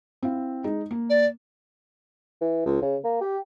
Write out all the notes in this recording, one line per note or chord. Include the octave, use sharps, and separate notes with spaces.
C4 E4 F5
G#3 D#4
A#3
D5
E3
C#2
C#3
A#3
G4